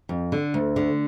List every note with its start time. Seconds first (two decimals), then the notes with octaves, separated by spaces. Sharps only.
0.09 F2
0.32 D3
0.54 D2
0.76 D3